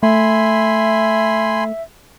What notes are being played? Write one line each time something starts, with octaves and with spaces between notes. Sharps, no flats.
A3 E5 G#5 B5 C6